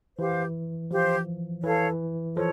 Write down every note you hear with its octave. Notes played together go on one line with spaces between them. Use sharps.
E3 G4 C5 F5
F3 G4 C5 F5
E3 A4 C#5 F5
F3 A4 C#5